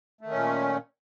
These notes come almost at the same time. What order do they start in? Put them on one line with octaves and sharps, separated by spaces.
A3 D#3 C#4 A#2